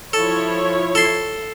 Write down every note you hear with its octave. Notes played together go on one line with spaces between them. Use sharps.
F3 E4 A4 C#5
A4 C6